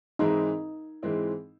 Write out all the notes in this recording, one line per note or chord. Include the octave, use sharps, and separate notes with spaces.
G#2 E3 G#3 C4 D#4 E4
G#2 E3 G#3 C4 E4